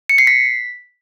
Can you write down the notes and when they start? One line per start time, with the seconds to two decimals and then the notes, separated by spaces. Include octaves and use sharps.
0.09 C#7
0.18 C7
0.27 B6